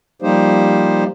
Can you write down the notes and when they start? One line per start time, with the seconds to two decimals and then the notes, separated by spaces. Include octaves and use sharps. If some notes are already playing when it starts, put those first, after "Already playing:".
0.22 F3 G3 A#3 D#4 G4 C5